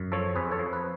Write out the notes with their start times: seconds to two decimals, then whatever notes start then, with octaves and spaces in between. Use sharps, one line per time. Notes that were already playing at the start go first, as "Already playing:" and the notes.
Already playing: F#2
0.12 F3 A4 C#5
0.36 F2 G#4 B4
0.51 A4 C#5
0.59 F3
0.73 B4